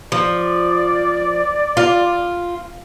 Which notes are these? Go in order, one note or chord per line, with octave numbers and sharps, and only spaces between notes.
F3 D5
F4